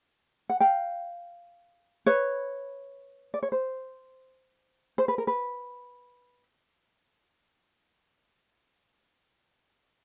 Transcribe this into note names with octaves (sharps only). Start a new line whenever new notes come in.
F#5
F5 G5
B4 C#5
D5
C#5
C5
C5
B4
A#4
B4